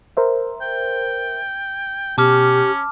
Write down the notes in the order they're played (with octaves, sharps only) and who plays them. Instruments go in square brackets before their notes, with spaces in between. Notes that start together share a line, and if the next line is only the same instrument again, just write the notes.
[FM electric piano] A#4 C5 E5
[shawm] G5
[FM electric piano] B2 [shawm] C#4 [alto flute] G4 [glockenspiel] A5 D6 F6